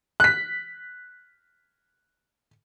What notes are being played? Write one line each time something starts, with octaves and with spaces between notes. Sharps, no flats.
F#6 B6